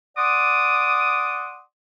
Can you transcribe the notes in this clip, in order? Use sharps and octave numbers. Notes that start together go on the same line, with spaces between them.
D5 F#5 C6 D6 D#6